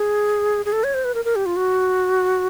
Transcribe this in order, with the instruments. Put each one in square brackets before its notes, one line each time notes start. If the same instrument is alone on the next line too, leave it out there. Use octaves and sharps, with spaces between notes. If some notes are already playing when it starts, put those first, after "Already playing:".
Already playing: [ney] G#4
G#4
A4
C#5
C5
B4
A#4
A#4
G4
F4
F#4